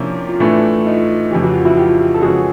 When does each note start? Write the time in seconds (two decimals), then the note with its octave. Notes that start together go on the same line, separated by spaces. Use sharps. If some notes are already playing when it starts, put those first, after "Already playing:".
Already playing: C3 F3 A#3 C#4 D4 E4
0.29 F4
0.40 A2 E3 A3 D4 E4
0.86 D#4 F4
1.31 F2 C#3 E3 G4
1.43 F#4
1.54 F4
1.65 E4 F#4
1.77 F4 G4
2.14 A4
2.22 F2 C#3 E3 G#3 C#4 F#4 G#4